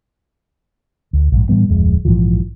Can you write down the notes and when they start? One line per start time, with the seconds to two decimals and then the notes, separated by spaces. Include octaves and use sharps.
1.13 D2
1.32 A#1 G#2
1.49 A2 E3 G3 B3
1.69 D1 F2 G#3
2.05 A#1 G#2 E3 F3